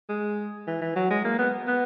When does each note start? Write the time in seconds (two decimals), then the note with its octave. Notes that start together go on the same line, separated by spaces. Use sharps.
0.09 G#3
0.67 E3
0.82 E3
0.96 F#3
1.10 G#3
1.25 A#3
1.39 B3
1.68 B3